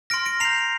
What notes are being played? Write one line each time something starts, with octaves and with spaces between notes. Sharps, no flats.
C6 F6 A#6 D7
A#6 D7
A#5 G6 C7 F7